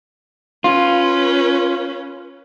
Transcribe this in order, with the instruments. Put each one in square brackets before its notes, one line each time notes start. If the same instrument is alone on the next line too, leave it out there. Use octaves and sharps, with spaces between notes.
[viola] C#4 B4 [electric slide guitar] F4